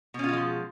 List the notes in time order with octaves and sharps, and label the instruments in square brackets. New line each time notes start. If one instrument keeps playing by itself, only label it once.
[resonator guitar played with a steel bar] B2
C#4
F4
G#3
F3